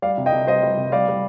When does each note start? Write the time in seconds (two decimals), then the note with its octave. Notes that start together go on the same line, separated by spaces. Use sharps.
0.02 G3 D5 F5
0.17 C3
0.26 D#5 G5
0.32 C3
0.47 G3 C5 D#5
0.63 G3
0.77 C3
0.92 G3 D5 F5
1.08 G3